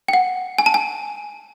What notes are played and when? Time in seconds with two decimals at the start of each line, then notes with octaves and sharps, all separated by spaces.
0.08 G5
0.13 F#5
0.58 G#5
0.66 A5
0.74 G#5